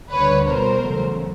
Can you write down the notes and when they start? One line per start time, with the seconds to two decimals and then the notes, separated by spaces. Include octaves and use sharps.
0.11 D2 D3 G3 B4 C#5
0.47 C2 B2 G3 A#4 C5
0.82 E2 C#3 F#3 A3